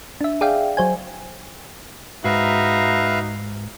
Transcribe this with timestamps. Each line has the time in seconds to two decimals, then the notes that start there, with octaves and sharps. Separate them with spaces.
0.21 D4 E5
0.41 G#4 D5 E5 F5 G5
0.77 F#3 C5 G#5
2.25 G#2 D#4 F#4 B4 E5 F5 A#5